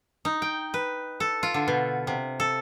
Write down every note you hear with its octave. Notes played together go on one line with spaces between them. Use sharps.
D#4
G5
B4
A4
F4
D3
B2
C3
A4